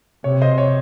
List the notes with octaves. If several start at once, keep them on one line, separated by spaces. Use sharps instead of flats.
C3 C#5
C5 D#5
C#5